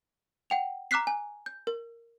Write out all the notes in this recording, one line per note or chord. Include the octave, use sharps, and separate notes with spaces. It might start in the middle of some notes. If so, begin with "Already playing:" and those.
F#5 G5 F7
A#5 D6 F6 F#6 B6 C7
G#5
G6
A#4